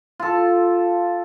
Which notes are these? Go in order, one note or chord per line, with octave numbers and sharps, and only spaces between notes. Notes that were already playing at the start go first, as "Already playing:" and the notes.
F4 A4